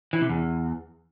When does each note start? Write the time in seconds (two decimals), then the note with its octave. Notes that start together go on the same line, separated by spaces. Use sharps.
0.13 E3
0.21 C3
0.29 E2